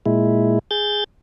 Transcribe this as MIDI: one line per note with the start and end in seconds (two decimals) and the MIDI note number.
0.06 0.59 46
0.06 0.59 56
0.06 0.59 64
0.71 1.04 68
0.71 1.04 91
0.71 1.04 93